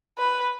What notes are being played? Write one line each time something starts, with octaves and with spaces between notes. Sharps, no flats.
B4